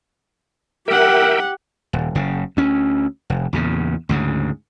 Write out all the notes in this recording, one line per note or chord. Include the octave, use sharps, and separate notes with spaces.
G4 A#4 E5 F#5 G5
D#1
F#1 C#3
D2 C#4
F1
E2 A#2 C#3
D2 G#2 C#3